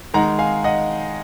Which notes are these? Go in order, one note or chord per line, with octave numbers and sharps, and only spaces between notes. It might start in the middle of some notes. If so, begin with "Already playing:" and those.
D#3 G#3 D#4 F#5 A#5
F5 G#5
D#5 F#5